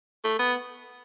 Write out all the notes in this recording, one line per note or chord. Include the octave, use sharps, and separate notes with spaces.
A3
B3